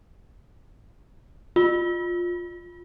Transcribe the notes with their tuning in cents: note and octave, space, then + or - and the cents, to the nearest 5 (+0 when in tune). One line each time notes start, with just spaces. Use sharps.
F4 +10